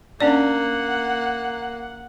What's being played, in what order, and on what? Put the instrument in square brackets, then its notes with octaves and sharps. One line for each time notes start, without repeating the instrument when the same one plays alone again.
[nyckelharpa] A#3 [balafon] C#4 D4 D5 [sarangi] F#5